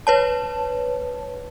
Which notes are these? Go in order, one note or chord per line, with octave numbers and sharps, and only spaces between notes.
B4 C#5 A5